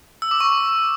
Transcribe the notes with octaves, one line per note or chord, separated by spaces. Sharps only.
E6
D6
C#6